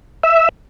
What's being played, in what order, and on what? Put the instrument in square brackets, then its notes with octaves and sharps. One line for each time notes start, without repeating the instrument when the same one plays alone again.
[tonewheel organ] E5